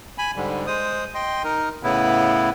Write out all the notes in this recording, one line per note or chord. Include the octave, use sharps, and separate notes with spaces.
G#5 B5
G#2 D3 G3
G#3 C5 D#6
D#5 G5 C6
D#4 A#4
A2 C#3 B3 E4